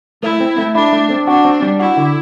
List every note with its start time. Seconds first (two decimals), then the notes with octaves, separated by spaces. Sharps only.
0.23 A3 E4
0.41 C4
0.58 A3
0.75 D4 E4
0.93 A3
1.10 C4
1.27 D4 F#4
1.45 C4
1.62 G3
1.80 E4 F#4
1.97 D3